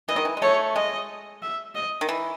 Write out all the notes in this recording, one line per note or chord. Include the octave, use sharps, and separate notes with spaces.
E3 D#5
D#3
E3
G#3
A3 C#5
G#3 D#5
E5
D#5
D#3
E3